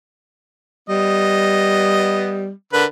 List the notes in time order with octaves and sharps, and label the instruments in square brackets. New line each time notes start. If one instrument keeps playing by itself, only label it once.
[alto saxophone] G3 [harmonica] B3 D#5
[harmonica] D3 B4 [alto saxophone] A#4